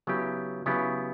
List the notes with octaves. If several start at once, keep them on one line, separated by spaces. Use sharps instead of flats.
C#3 F#3 B3 E4 G4
C#3 F#3 B3 E4 G4